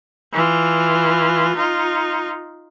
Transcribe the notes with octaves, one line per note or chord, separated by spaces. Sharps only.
E3 F4
D#4 F4